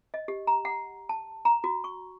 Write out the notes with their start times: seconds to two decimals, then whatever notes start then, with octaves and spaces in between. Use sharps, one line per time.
0.14 D#5
0.28 G4
0.47 A#5
0.65 F#5
1.09 A5
1.45 A#5
1.64 F#4
1.84 C#6